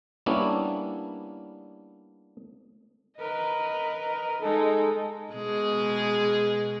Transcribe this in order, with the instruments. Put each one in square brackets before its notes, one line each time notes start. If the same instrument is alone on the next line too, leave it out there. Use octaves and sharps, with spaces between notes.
[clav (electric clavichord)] G3 A#3 B3 C#4 D4 E4
[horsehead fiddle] A#4 B4 [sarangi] D#5
[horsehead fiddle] G#3 [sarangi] D#4 [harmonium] A4
[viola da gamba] B2 G#3 G#4